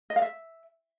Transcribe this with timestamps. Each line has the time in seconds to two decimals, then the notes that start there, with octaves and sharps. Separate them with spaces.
0.10 D#5
0.16 F5
0.22 E5